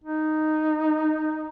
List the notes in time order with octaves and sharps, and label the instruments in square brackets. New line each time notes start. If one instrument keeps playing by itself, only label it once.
[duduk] D#4